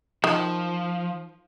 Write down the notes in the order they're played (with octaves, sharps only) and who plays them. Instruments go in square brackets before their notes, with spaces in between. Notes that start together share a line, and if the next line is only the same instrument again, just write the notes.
[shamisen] D#3 [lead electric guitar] F3